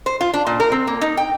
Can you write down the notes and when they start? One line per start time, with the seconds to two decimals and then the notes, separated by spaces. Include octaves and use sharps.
0.06 C5
0.21 F4
0.34 D4
0.47 A#2
0.60 A#4
0.72 C4
0.87 A#3
1.01 D#4
1.17 G5